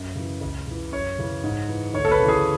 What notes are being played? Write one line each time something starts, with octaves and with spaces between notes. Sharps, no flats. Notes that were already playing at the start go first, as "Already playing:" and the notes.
Already playing: F#2
C#3 E3
C#2
C#3 E3
F#2 C#5
C#3 E3
G#2
E3
D2 C#5
A4
B4
C#3
E3 G#4